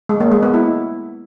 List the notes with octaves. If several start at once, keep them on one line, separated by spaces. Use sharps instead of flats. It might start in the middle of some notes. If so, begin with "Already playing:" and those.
G#3
A#3
G#3
B3
E4